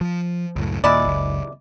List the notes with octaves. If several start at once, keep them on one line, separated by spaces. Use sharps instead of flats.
F3
C#2 F#2 A2
D#2 A#2 G#3 E4 D5
F#1 C#2